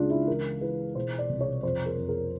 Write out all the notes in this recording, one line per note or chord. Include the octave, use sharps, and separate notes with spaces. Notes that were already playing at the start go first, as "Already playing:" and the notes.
Already playing: C#2 C#3 D4 F4
E4
E3 A#4
E3 B4
B2 C5
D5
C2
C#5
F2 C5
A#4
F2
A#4